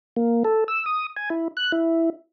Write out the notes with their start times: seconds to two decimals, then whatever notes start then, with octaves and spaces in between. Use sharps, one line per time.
0.16 A#3
0.44 A4
0.68 E6
0.86 D#6
1.16 G#5
1.30 E4
1.57 F#6
1.72 E4